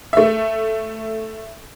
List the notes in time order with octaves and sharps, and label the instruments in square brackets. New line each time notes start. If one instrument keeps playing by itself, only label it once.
[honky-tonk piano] A3 E5